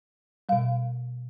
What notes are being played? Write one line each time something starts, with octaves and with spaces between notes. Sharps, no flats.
B2 G3 F5